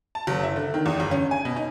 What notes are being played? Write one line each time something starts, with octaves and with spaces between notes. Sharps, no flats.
A5
F#1
E4
D3
D#3
E2
G1
C#4
G#5
B2
D#4